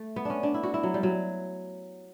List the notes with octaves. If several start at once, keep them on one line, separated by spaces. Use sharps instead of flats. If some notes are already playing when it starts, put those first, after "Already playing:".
Already playing: A3
B3
C#4 D4
D4
E4
F#4
E4
F#3
G3
F#3